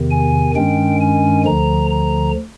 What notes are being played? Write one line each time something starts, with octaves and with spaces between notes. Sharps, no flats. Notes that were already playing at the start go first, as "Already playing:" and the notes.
Already playing: E2 C3 D#3
G#5
G2 D#3 G#3 C#4 G5
G#5
D2 D3 F3 A#5
A#5